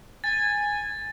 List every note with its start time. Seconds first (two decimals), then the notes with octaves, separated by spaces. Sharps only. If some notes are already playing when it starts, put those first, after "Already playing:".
0.24 G#5 A6